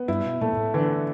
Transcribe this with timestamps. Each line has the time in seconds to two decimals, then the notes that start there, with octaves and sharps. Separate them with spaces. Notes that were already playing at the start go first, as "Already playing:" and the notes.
Already playing: B3
0.08 G2 E4
0.25 B2
0.41 A#2 A3
0.53 G#2
0.57 A2
0.74 D3 E3